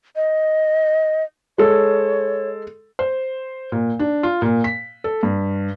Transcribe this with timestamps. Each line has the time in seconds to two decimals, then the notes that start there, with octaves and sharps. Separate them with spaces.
0.16 D#5
1.58 G#3 A4 C#5
2.99 C5
3.72 A#2
3.99 D4
4.23 F4
4.42 A#2
4.64 B6
5.04 A4
5.23 G2